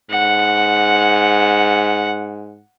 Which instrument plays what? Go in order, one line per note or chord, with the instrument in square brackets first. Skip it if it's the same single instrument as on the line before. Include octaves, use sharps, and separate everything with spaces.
[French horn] G#2 [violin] F#5